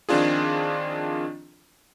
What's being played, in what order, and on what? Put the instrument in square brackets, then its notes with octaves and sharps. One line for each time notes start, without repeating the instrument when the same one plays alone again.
[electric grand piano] D#3 F3 C4 D4 F4 G#4